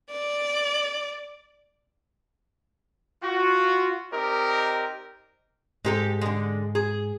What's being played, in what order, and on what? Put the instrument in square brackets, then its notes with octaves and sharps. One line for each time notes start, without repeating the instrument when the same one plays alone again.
[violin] D5
[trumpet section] F4 F#4
C4 D#4 G4 A#4 D5 D#5
[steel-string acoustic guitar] G#2 [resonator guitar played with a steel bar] G#3 G4 A4
[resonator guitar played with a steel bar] D3 G#3
G#4